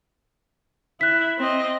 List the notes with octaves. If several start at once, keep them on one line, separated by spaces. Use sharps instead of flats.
E4 F#6 B6
C4 D#5